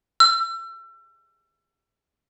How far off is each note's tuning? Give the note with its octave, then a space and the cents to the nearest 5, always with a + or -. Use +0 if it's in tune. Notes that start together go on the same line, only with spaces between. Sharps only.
E6 +35